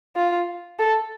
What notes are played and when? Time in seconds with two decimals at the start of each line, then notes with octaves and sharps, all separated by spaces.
0.16 F4
0.79 A4